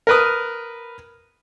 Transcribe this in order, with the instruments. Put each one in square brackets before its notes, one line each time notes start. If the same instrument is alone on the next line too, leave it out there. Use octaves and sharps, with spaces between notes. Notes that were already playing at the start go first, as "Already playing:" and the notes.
[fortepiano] A#4 B4 D#6